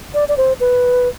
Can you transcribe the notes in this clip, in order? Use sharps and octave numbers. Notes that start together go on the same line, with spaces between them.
D5
D5
C5
B4